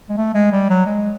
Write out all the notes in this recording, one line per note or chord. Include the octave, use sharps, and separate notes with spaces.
G#3
A3
G#3
G3
F#3
G#3